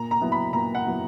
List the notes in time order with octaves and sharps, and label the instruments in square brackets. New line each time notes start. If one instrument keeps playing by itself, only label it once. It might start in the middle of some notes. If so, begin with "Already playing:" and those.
Already playing: [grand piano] A#2 A#5
A#5
F#3 B3 E4
B5
A#2 A#5
F#5
F#3 B3 E4